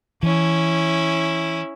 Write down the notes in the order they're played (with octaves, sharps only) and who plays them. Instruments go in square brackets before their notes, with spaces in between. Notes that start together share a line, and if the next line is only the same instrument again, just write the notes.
[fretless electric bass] E3 [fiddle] C#4 E4